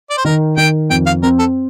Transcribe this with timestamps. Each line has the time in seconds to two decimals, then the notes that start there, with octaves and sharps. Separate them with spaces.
0.10 D5
0.18 C5
0.25 D#3 A#4
0.57 D#3 G5
0.90 F2 G5
1.06 F5
1.23 C4 A#4
1.39 A4